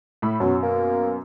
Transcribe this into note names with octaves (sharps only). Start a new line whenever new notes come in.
A2 B5 E6
F#2 B2 F#3
A#3